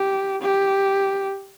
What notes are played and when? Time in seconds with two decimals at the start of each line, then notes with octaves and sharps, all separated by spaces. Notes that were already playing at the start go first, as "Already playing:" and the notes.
Already playing: G4
0.42 G4